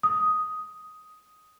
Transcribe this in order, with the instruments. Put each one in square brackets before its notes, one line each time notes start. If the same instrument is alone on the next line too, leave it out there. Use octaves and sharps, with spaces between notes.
[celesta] D#6